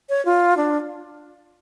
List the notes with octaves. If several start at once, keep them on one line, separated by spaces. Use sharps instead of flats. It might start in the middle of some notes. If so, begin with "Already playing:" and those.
C#5
F4
D4